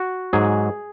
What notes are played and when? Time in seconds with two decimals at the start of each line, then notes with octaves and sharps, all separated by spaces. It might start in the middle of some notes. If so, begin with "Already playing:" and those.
Already playing: F#4
0.33 G#2 F#3 G#4